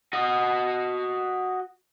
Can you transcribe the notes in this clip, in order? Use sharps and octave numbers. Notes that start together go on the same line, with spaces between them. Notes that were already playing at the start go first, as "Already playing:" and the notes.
F#4 D#5